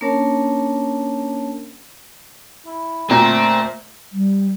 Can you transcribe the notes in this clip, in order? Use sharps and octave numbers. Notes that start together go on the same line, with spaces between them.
A#3 C#4 D4 A#4 C#5 A5
E4
A#2 A3 C4
G3